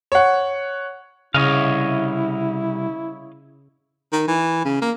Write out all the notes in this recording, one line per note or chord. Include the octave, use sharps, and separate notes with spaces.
C#5 F#5
C2 G#2 C#3 E4 C#5 D#5 F5
D#3
E3
C#3
A#3